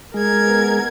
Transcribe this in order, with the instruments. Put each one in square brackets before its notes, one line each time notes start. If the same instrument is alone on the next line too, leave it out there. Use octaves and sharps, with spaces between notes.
[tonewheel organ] G#3 [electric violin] A#4 G#6
[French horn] B3